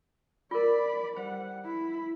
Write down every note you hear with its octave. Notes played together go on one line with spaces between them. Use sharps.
F4 A#4 D5 B5
G3 C5 F#5
E4 B5